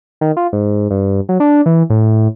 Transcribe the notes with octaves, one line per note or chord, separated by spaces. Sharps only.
D#3
F4
G#2
G2
F#3
D4
E3
A2